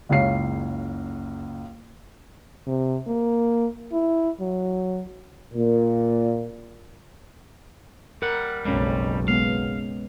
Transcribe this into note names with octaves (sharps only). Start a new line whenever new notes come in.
F#1 C#2 C#5 F5 C7
C3
A#3
E4
F#3
A#2
G3 A#4 F#5
F#1 B1 F2 G3 G#3 C#4
G#3 B3 F5